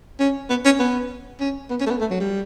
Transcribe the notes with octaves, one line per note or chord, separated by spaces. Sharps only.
C#4
B3
C#4
B3
C#4
B3
C#4
A3
B3
A3
F#3
G3